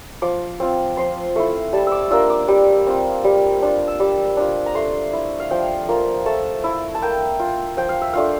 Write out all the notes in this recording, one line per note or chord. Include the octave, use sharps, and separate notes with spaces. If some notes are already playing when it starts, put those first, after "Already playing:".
F3 D6
C4 F4
F3 C6
A3 E4
G3 A5
D6 E6
A#3 D4 F4 E6
D6
G3
C4 F4
G3
D4 F4
E6
G3 D6
D4 F4
A#5
A3 C6
E4
F5
F3 G5
A#3 F4
A3 A5
E4
A5
A#3 G5
F4
F3 G5
F5
E5
A3 D4 F4 F5